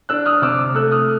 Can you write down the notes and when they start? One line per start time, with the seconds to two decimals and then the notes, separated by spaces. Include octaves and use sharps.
0.09 D4 E6 F#6
0.26 D#6 F6
0.42 C3 D6 E6
0.75 A3 E6 F#6
0.91 D#6 F6